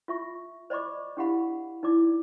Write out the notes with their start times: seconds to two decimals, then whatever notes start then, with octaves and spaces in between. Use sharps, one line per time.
0.08 F4 E5 C#6
0.70 C5 D5 D#5 B5 C#6 D6
1.17 D4 E4 G4 F5 F#5 B5
1.83 D#4 E4 D5 D6